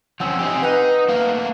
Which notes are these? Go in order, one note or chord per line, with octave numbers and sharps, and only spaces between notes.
F3 C4 C#4 F#5 E6
C4 D#4 G4 G#5
D#4 B4 F#5 F#6
A3 A#3 F5